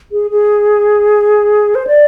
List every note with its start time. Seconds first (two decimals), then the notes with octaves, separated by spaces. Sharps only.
0.12 G#4
0.31 G#4
1.75 C5
1.87 D5